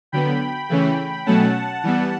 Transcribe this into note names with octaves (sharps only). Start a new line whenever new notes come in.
D3 F#3 B3 G5 B5
C#3 E3 A3 C#4
B2 F#3 A3 C#4 F#5 A5
E3 G3 B3